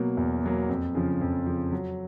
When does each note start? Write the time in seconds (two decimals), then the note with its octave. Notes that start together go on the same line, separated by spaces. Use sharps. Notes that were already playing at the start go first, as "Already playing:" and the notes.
Already playing: B2 F#3 A#3
0.17 E2
0.43 B2 F#3 A#3
0.69 F2
0.95 C#3 F3
1.21 F2
1.46 C#3 F3
1.72 F#3